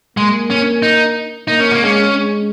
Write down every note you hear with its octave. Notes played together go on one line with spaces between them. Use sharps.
G#3 A#3
C#4
D#4
A#3 D#4
C#4
A#3
G#3 C#4
G#3